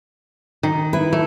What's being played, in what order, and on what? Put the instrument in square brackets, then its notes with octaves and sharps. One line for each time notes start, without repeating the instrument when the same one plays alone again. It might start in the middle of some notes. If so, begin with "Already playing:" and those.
[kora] D#3
[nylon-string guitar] E4 B4
[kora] A3